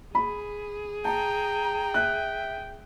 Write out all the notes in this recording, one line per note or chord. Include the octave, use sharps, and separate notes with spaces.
G#4 B5
G5 A5 A#5
E5 F#6